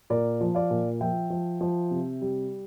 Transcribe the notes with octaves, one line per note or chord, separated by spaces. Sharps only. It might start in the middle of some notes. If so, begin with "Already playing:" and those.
A#2 A#4 D5
F3
D5 F5
A#2
F3 E5 G5
F3
F3
C3
G3